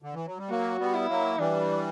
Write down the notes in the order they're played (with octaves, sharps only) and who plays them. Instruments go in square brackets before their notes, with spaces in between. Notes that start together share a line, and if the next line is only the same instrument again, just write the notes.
[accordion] D3
E3
F#3
G3
[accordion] F#3 A#3 [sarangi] F#4
[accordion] G3 B3
[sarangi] E4
[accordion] F#3 A#3
[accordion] E3 G3 [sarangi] D4